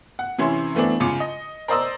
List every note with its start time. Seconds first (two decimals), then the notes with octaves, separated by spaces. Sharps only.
0.19 F#5
0.38 C3 E3 C#4 E4 C6
0.75 E3 A3 B3 C4 D4
1.00 G#2 C#3 F4 D6 C#7
1.20 D#5
1.68 A#4 C5 D5 D#5 D#6 E6